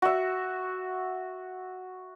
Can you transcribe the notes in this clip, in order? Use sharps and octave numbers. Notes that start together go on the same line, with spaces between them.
F#4 E5